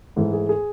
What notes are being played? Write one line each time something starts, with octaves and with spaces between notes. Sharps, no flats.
G#2 E3 A3
G#4
G#4